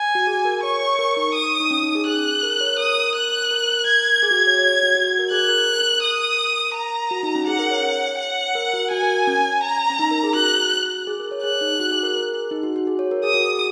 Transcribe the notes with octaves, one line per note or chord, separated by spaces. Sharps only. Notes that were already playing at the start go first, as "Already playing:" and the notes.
Already playing: G#5
F#4
G#4
A#4
C#5 C#6
C#5
A#4
D#4
D#6
D#4
C#4
D#4
G#4
G#4 F#6
A#4
C#5
A#4 D#6
F#6
A#4
G#6
G#4
F#4
G#4
C#5
C#5
F#4
F#4
F#4
A#4
G#4 F#6
A#4
A#4
D#6
A#5
F#4
D#4
C#4
G#4 F#5
A#4
C#5
F#5
A#4
F#4
F#4 G#5
A#4
C#4
A#5
C#4
D#4
A#4
G#4
F#4 F#6
G#4
A#4
C#5
G#4 F#6
D#4
F#4
G#4
A#4
A#4
G#4
D#4
F#4
F#4
G#4
C#5
A#4
G#4 D#6
F#4
G#4